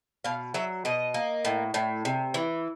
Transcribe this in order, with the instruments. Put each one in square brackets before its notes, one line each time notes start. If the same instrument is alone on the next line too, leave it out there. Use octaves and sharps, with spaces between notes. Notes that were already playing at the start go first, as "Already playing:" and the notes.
[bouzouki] B2 F5
F#3 E5
B2 D#5
A#3
A2
A2
C3
E3